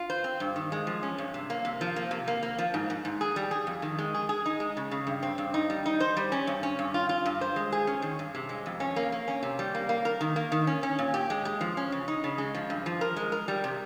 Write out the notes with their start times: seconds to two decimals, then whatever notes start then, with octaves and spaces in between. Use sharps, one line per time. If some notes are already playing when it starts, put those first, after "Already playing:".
Already playing: F4
0.10 C5
0.24 C4
0.40 G2
0.56 D#3
0.72 G#3
0.87 F3
1.03 C#4
1.18 G2
1.34 C3
1.50 A#3
1.65 C3
1.81 F3
1.96 A#3
2.11 C3
2.28 A#3
2.43 A#3
2.58 F3
2.74 G#2
2.90 G#2
3.05 G#2
3.21 G#4
3.36 G3
3.51 G#4
3.67 F2
3.82 D#3
3.98 G#3
4.14 G#4
4.29 G#4
4.46 D#4
4.60 G#3
4.77 C#3
4.91 C#3
5.07 G2
5.23 C4
5.38 G2
5.54 D#4
5.70 G3
5.86 D#4
6.00 C5
6.17 G3
6.32 C#4
6.47 G2
6.63 C#4
6.79 G2
6.94 F4
7.09 F4
7.26 G2
7.41 C5
7.56 G#3
7.72 G#4
7.87 C#4
8.02 D#3
8.19 G2
8.35 C3
8.49 G#3
8.66 F2
8.80 C#4
8.96 A#3
9.12 A#3
9.28 C#4
9.43 C3
9.59 G3
9.75 A#3
9.89 A#3
10.05 A#4
10.21 D#3
10.36 A#3
10.52 D#3
10.67 C#4
10.83 C#4
10.99 A#2
11.14 G4
11.30 G#3
11.45 G#3
11.61 F3
11.77 C#4
11.92 C#3
12.08 D#4
12.24 C#3
12.38 G#3
12.54 F3
12.70 G2
12.86 F3
13.01 A#4
13.17 G#3
13.32 A#4
13.48 G3
13.64 C3